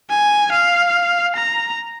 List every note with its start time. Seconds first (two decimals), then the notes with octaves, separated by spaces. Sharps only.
0.10 G#5
0.52 F5
1.36 A#5